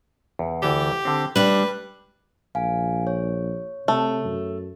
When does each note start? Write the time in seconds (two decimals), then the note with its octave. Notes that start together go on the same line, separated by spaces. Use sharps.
0.39 E2
0.62 D2 E3 G4 A5
1.05 D3 C4
1.36 G3 D4 B4 E5
2.55 A#1 F5 G#5
3.07 C#5
3.88 C3 A3
4.25 F#2